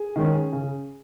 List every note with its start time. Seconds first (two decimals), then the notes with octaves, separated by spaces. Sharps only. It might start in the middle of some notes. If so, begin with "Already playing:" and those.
Already playing: G#4
0.16 D#3 G#3 C#4
0.52 C#3